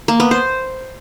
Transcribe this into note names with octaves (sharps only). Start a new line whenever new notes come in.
A#3
B3
C5